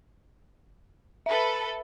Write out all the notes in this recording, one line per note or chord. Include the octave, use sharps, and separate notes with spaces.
A4 B4 E5 B5